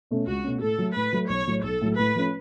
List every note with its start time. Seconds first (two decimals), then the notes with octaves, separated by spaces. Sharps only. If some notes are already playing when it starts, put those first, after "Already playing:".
0.11 B2 A3 C#4
0.27 C#2 F#4
0.44 B2 A3 C#4
0.62 A2 A4
0.78 F#3 A3
0.95 A2 B4
1.13 F#3 A3
1.29 B1 C#5
1.47 A2 F#3
1.63 B1 A4
1.81 A2 F#3
1.97 A2 B4
2.15 F3 A3 C#4